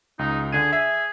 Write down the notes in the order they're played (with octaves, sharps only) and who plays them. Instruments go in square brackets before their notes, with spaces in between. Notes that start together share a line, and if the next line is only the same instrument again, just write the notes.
[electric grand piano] C#2 [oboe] D#4
[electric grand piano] D3 D#7 [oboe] G#4
[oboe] G#4 [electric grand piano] E5